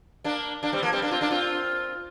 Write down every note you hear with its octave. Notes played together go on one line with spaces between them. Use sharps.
A#3 D4
A#3 D4
G3 C4
F3 A#3
G3 C4
A#3 D4
C4 F4
A#3 D4
C4 F4